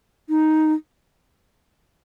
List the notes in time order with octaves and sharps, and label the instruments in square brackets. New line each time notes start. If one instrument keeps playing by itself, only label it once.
[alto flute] D#4